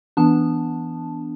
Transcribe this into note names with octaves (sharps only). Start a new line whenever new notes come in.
E3 B3 D4 A5